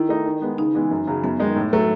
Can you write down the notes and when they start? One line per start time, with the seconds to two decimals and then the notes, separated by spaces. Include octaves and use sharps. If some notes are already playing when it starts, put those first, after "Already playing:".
Already playing: D#3 E4
0.09 A3 D#4
0.26 D#3
0.42 G#3 B3
0.58 C#3 D#4
0.75 E3 G#3 B3
0.91 F#2
1.07 C#3 F#3
1.24 F#2 B3
1.40 D#3 G#3 D#4
1.56 A2
1.73 F#3 A3